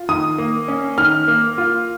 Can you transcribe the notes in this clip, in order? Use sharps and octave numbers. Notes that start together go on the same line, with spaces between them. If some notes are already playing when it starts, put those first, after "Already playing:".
Already playing: F4
D#3 D#6
A#3
C#4
D#3 F6
A#3
F4